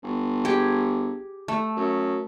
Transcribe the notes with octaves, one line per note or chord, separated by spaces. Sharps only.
G1
G4 G#4
A3
F#2